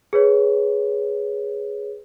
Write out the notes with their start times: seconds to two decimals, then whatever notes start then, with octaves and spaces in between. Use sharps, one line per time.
0.13 G#4 B4 C#5